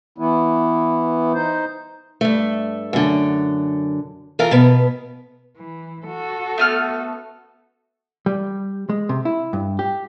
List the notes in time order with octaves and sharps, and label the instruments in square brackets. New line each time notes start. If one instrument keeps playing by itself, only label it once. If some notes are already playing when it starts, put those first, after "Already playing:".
[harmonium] E3 B3 E4
D#4 C5
[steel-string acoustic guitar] G2 A3
F#2 D3
E3 F4 A4 A#4
B2 B3
[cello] E3
F#4 A4
[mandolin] A3 B3 F6
[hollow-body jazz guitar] G3
G#3
C3
E4
G2
G4